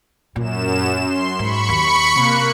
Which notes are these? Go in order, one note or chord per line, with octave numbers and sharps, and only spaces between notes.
F#2 A#2 E7
C6
G#2 B5 C#6 C#7
D#2
C3 A#3 F#6